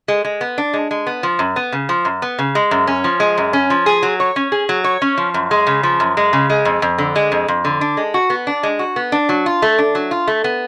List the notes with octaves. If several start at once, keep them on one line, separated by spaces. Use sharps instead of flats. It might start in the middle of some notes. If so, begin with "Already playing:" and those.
G#3
G#3
B3
D4
G#3
G#3
B3
F3
F#2
B3
C#3
F3
F#2
B3
C#3
G#3
F#2
C#4
F3
G#3
F#2
C#4
F3
G#4
F#3
C#5
C#4
G#4
F#3
C#5
C#4
F3
F#2
G#3
C#3
F3
F#2
G#3
C#3
G#3
F2
F2
D3
G#3
F2
F2
D3
D4
G#3
F#4
B3
D4
G#3
F#4
B3
D4
F#3
F4
A3
D4
F#3
F4
A3
B3